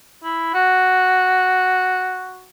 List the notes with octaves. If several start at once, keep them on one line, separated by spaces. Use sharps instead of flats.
E4
F#4